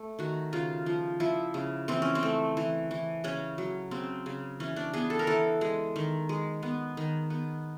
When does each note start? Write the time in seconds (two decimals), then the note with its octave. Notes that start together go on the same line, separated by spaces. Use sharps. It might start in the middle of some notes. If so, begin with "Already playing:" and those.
Already playing: A3
0.19 D#3 F#4
0.53 C#3 F4
0.86 F3
1.20 F3 E4
1.54 C#3
1.88 E3 C4
2.02 C#4
2.15 C4
2.23 A3
2.57 E3
2.91 E3
3.24 C#3 C#4
3.58 F#3
3.91 C#3 C4
4.26 C#3
4.60 E3 C#4
4.76 D4
4.93 B3 G#4
5.10 A4
5.19 A#4
5.27 E3 A4
5.61 G#3
5.96 D#3
6.29 G#3
6.63 B3
6.97 D#3
7.30 B3